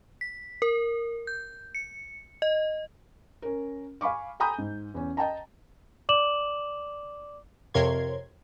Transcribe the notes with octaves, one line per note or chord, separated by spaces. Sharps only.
B6
A#4
G6
C#7
D#5
C#4 A#4
F5 G#5 B5 C#6 D6
G5 G#5 A#5 B5 D#6 G6
G#2
E2 C#4
D#5 G5 A5 A#5
D5 D6 E7 F#7
F2 C3 A#4 C#5 C6 G#6